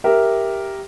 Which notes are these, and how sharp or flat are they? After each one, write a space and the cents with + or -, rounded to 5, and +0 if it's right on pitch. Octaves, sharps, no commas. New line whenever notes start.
G4 +0 A#4 +0 E5 +0